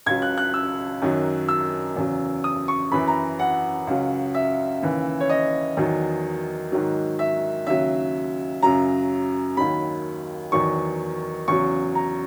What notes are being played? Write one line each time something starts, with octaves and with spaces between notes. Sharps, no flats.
C#2 C#3 F#3 G#6
F#6
F#6
E6
F#2 D#3 F#3
E6
E2 C#3 F#3
D#6
C#6
F#2 E3 B5
A#5
F#5
C#2 C#3 F#3
E5
D#2 C#3 E3
C#5
D#5
E2 D#3 F#3
G#2 D#3 F#3
E5
D#2 C#3 F#3 E5
F#2 C#3 F#3 A#5
D#2 D#3 F#3 B5
E2 D#3 F#3 C#6
E2 C#3 F#3 C#6
A#5